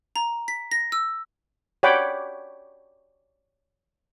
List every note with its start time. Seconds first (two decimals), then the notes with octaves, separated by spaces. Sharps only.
0.16 A#5
0.48 B6
0.72 A#6
0.92 E6
1.83 C#5 D5 F#5 G5 B5 D6